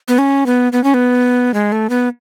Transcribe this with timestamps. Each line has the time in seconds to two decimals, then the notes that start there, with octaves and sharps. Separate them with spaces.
0.08 B3
0.18 C#4
0.46 B3
0.72 B3
0.84 C#4
0.94 B3
1.54 G#3
1.72 A3
1.90 B3